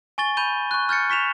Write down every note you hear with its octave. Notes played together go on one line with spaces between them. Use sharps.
G#5 C#6 A6 G7
B5 G6 D#7 G7
C#6 F#6
F6 G6 A6 C#7
C#6 B6 E7 F7